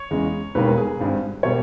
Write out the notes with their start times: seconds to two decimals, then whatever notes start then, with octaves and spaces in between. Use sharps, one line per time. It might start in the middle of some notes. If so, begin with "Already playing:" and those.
Already playing: C#5
0.10 E2 C#3 G#3
0.55 E1 D#2 D#3 G3 A#3 B4
0.78 G#4
0.99 G#1 G2 G3
1.43 B2 G3 A#3 C#5